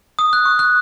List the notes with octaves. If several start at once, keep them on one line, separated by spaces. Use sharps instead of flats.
D#6
F#6
C#6
F#6